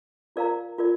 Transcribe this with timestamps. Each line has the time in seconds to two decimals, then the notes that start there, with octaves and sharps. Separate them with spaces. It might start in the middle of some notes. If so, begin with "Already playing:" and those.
0.36 F4 A#4 D5 F5 A#5
0.78 F4 A#4 D5